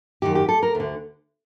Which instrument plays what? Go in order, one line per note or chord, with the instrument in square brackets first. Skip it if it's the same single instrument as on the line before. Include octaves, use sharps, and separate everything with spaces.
[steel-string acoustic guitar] F#2 D#3 G4
G4
A4
A#4
D2 D3